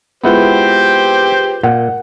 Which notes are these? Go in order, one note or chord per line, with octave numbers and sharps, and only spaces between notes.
G#3 B3 E4 F4 G4 B4 C5 F#5
A#2 F#5